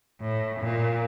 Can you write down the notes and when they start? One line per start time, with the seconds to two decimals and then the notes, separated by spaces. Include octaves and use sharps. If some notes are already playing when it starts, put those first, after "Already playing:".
0.21 A2
0.60 A#2